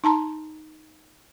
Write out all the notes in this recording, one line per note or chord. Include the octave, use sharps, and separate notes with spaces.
D#4 A5 A#5 C6